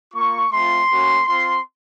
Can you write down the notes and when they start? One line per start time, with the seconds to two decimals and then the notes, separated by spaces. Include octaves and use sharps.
0.14 A#3 F4 C#6
0.51 A3 C4 F4 C6
0.89 A#3 C#4 F#4
1.27 C4 F4 C6